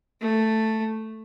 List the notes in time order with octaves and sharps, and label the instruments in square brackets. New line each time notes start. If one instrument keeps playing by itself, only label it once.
[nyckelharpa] A3